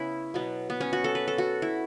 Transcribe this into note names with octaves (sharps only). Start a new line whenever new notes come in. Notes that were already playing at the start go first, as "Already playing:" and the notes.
Already playing: C#3 B3 C#4 E4
B2 F#3 B3
B3
C#4
F#4
A4
B4
A4
F#4
E4